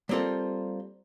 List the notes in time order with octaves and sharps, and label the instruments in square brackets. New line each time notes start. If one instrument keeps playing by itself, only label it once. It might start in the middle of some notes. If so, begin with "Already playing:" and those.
[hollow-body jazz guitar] G3 A#3 C4 F4 A4